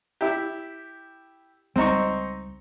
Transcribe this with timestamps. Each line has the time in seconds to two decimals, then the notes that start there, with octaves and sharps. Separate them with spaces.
0.21 E4 G4
1.76 C#2 G3 C4 D#4 C#6